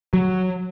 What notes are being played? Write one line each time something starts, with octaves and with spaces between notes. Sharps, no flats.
F#3